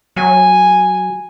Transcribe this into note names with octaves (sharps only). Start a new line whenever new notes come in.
F#3 G#5